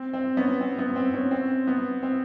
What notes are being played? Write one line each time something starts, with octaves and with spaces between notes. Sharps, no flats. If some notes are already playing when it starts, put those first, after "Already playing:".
Already playing: C4
C4
B3 C#4
C4
B3
C4
B3 C#4
C4
B3
C4